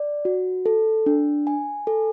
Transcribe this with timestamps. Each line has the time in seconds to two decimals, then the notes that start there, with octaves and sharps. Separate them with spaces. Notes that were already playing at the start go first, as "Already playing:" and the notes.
Already playing: D5
0.25 F#4
0.66 A4
1.06 D4
1.47 G#5
1.87 A4